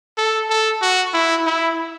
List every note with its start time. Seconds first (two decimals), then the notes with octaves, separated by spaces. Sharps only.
0.18 A4
0.50 A4
0.82 F#4
1.14 E4
1.46 E4